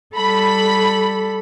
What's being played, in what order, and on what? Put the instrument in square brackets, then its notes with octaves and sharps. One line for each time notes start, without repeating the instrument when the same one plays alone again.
[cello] G3 A4 [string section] B5